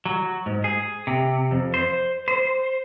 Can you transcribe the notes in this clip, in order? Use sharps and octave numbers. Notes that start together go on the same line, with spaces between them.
F#3
G#2
G#4
C3
F2
C5
C5